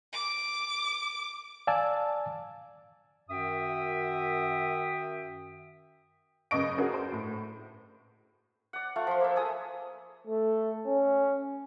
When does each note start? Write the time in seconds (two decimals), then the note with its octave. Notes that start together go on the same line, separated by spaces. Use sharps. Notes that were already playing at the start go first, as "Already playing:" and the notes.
0.13 D6
1.67 D5 F5 G#5 A5 E6
3.29 F#2 D#3 F#4 E5 G5 D#6
6.51 F#2 C#3 B4 D#5 C#6 D7
6.78 C#4 D4 F#4 G#4 A#4
6.94 C5
7.12 A2
8.73 D5 F#5
8.96 A3 F4 F#5
9.07 F3 C6
9.21 A#3 E5
9.36 G#4 A4 D#6
10.27 A3
10.87 C#4